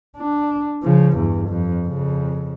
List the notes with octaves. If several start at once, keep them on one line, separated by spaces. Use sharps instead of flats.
D4
C#3 F3
E2 G2
F2
F2 C#3